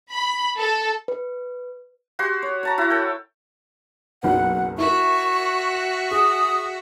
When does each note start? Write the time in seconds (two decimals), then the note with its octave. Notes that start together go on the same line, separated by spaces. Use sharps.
0.13 B5
0.57 A4
1.08 B4
2.19 F#4 G4 C6
2.42 C#5
2.63 C#5 A5 A#5
2.78 E4 F#4
2.90 A4 G5
4.23 F#1 B1 B4 F#5
4.78 E4 F#4 A#4 E5 C#6
6.11 G#4 D#6